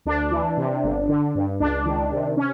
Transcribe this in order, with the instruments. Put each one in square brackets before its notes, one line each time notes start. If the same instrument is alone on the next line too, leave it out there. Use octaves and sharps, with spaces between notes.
[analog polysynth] D2 D4
E3
C3
G1
D3
G2
C#2 D4
D#3
C3
C#4